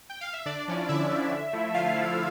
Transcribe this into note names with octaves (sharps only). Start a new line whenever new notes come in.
G5
F5
E5
D3 D4 D5
F3 C#4 E4
D3 E4 E5
F3 C#4 E4
D3
F3 A3 E4
D3 F4 F5
F3 A3 E4